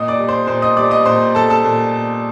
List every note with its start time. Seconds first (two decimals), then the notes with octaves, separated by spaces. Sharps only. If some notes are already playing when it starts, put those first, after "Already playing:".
Already playing: A#2 D#5 D#6
0.08 D5 D6
0.19 G3
0.29 C5 C6
0.47 A#2 C5 C6
0.62 D#5 D#6
0.77 G3 D5 D6
0.91 D#5 D#6
1.06 A#2 C5 C6
1.35 G3 A4 A5
1.50 A4 A5
1.64 A#2